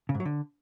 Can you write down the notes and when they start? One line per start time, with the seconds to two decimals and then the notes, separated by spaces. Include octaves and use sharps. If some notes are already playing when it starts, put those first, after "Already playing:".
0.09 C#3
0.15 G#2
0.20 F#3
0.25 D3